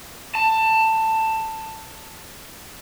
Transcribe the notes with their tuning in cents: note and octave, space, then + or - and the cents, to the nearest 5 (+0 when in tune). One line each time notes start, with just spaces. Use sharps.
A5 +15